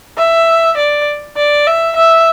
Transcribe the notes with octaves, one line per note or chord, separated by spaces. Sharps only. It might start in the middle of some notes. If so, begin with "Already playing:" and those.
E5
D5
D5
E5
E5